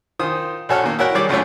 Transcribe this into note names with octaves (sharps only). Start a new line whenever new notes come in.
D#3 F4 C5 D#6
A#1 F#4 A4 C#5 A5 F6
D#3 A#3
E4 F#4 A#4 C#5 G5 F#6
D#3 G3 G#4 C#5 D5 D6
C#2 F#2 A3 D4 F4 C#5